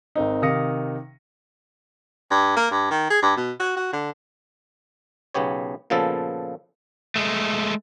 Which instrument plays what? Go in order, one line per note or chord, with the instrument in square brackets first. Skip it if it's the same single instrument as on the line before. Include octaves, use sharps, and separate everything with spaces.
[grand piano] G#1 C4 D#4
C3 D#3 F5 D#6 A#6 C#7
[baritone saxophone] G2
A#3
G2
D#3
G#4
G2
B2
F#4
F#4
D3
[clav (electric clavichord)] B1 C#3 B3 G4 C#5
A#2 C#3 F3 B3 A4
[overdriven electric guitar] G#3 A3